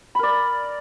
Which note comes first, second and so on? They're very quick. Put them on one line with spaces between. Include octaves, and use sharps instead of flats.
B5 A#4 D5